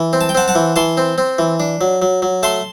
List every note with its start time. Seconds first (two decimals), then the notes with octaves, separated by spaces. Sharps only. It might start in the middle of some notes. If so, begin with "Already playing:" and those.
Already playing: E3
0.13 C4
0.21 A5
0.29 G5
0.35 C4 F#5 A5
0.48 F#5 A5
0.55 E3
0.76 E3 A5 C6
0.97 C4
1.18 C4
1.39 E3
1.60 D4
1.81 F#3
2.02 F#3
2.22 F#3
2.43 A3 A5 C6